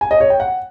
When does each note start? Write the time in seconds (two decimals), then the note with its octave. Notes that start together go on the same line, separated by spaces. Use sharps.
0.01 G#5
0.11 D#5
0.20 C#5
0.30 G5
0.40 F#5